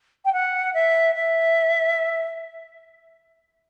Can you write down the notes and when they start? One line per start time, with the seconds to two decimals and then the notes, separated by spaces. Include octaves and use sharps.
0.25 G5
0.33 F#5
0.74 E5
1.15 E5